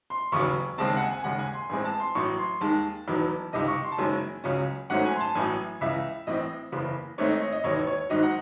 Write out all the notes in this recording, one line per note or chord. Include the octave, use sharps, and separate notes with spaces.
C6
E1 D#2 C#3 F#3 C#6
D#2 C#3 G#3 C4 A5
F#5
G#5
G#5
D#2 C#3 G#3 F#5
G#5
C6
A1 A2 G#3 C4 G#5
A5
C6
A1 A2 F#3 C#6
C6
D#2 D#3 G#3 A5
E1 E2 D#3 F#3
C#2 C3 D#3 D#5
C#6
C6
A5
F#1 F#2 D#3 G#3 C#4 G#5
C#2 C#3 F#3 C#4
G#1 G#2 F#3 A3 C#4 F#5
G#5
C6
A5
A1 A2 F#3 G#5
C#2 C#3 E3 E5
A1 A2 E3 C4 D#5
F#1 E2 C#3
G#2 D#3 A3 C4 C#5
D#5
C#5
D#5
E1 D#2 D#3 C#5
C#5
G#1 G#2 D#3 F#3 D#5
F#5